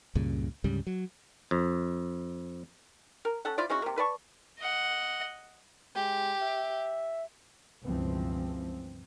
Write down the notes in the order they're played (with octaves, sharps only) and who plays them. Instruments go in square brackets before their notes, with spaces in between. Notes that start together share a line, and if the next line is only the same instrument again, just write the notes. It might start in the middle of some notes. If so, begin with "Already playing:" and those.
[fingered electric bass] C#2 G2 A#2 C#3
D2 G#2 C#3 G3
F#3
[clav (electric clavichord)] F2
[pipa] A#4
C#4 A4 F#5
E4 F4 C5 D5
G#3 C#4 E4 F#4
C3 A#3
B4 D5 A5 C#6
[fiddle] D#5 F#5
[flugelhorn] G#3 [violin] G4
[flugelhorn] E5
[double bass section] C#2 G2 B2 E3 F3 C4